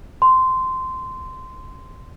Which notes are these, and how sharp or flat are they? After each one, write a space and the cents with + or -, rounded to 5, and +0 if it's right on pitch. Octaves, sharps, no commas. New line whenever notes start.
C6 -15